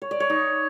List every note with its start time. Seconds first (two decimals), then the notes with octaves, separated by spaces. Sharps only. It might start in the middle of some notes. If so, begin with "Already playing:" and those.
0.02 C#5
0.11 D5
0.20 C#5
0.30 D#4